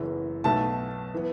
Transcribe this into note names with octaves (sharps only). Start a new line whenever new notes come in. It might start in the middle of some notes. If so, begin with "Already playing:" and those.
Already playing: F#1 F#2 E3 B3
B1 B2 A3 A5
E3 B3